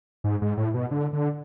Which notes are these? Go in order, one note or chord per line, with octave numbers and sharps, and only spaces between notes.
G#2
G#2
A2
B2
D3
D3